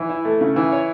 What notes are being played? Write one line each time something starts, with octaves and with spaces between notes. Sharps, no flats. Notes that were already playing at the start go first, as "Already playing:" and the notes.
Already playing: E3
E4
A3
C#3
E3
C#5